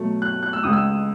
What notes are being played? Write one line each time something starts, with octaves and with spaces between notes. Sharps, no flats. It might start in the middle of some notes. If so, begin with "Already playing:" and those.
Already playing: B2 F#3 A3
F#6
F#6
E6
C#2 C#3 G#3 D#6
E6